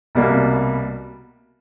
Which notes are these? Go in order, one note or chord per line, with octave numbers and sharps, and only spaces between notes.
C2 B2 G3 A#3